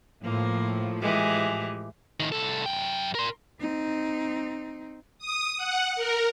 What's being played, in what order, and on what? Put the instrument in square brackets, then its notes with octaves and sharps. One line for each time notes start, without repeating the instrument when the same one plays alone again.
[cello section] A2 F3 [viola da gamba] A#3
[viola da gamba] E3 G#3 G4
[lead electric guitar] A2 D#3
C2 A4
F#2 G5
A#4 C6
[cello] C4 D#4
[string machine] D#6
F#5
A#4